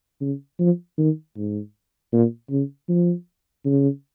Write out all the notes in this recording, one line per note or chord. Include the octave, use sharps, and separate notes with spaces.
C#3
F3
D#3
G#2
A#2
C#3
F3
C#3